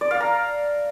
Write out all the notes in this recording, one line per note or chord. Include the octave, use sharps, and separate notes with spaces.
D5
F5
A#5